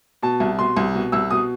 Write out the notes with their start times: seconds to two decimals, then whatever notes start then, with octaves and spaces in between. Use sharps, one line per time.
0.23 B2 A5
0.40 C2
0.59 B2 C6
0.77 C2
0.94 B2
1.12 C2 E6
1.30 B2 D#6